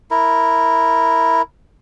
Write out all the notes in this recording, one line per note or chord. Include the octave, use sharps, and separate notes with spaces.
E4 A#4